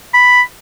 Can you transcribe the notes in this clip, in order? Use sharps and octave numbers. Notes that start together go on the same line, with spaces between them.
B5